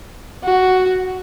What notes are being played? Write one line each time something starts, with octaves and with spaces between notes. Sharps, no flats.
F#4